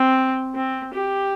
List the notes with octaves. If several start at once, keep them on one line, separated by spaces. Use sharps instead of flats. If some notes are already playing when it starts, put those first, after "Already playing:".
Already playing: C4
C4
G4